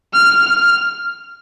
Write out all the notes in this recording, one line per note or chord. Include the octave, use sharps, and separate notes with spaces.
F6
F6